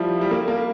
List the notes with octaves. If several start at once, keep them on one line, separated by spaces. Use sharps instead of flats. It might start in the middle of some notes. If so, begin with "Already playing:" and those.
Already playing: F3 G3 E4
G3
A#3
A#3